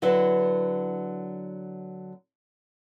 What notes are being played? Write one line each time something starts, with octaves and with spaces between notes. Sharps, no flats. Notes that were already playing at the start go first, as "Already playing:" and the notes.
D3 F#3 C4 E4 B4